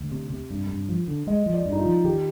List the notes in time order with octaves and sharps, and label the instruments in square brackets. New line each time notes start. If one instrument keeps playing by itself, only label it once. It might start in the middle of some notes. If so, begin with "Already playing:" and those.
Already playing: [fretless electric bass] D2
C3
C3
G2
G2
F3
D3
[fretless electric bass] G#3 [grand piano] D#5
[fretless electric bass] F3
[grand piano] D5
[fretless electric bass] G2
[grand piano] D#4
F4
[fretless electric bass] F3
[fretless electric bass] D#3 [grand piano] G4